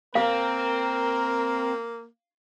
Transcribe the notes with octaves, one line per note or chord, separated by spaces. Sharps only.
A#3 C4 A#4 F5